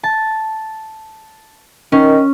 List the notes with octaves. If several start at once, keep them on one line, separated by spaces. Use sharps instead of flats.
A5
D#3 C#4